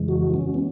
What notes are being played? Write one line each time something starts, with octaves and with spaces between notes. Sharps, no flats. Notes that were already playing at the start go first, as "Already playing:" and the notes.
Already playing: F2 C#3 E3 G#3
F#4
C#4
B3